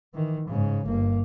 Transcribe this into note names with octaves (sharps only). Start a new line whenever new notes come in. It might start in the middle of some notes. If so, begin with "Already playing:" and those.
D#3 E3
G#2 C#3
G1 A#3